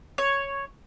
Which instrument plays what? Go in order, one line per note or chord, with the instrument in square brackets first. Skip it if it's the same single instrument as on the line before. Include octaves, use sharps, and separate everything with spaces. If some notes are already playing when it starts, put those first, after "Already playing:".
[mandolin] C#5